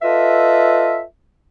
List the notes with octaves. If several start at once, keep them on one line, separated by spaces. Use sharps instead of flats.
F4 A4 B4 D#5 E5